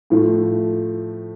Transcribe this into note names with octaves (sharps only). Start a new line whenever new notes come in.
A2 F3 A3